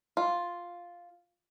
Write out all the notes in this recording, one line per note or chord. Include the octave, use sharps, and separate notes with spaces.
F4